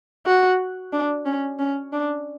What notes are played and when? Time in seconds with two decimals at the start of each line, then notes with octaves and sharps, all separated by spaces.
0.26 F#4
0.93 D4
1.26 C#4
1.59 C#4
1.93 D4